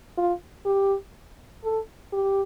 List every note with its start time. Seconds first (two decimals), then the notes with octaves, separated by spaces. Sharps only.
0.17 F4
0.65 G4
1.64 A4
2.12 G4